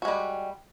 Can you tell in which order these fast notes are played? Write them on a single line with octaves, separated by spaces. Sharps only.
F#4 G#3 G3